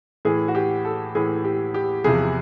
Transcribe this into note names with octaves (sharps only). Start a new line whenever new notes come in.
A2 E3 G#4
F#4
G4
A4
A2 E3 G#4
G4
G4
E2 C3 F3 G#4